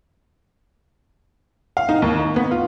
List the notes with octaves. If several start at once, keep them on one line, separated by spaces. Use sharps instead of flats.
F5
D#4
D#2
D#4
B3
F4